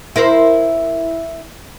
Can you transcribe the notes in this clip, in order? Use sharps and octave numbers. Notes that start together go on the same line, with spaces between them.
E4 A#4 C5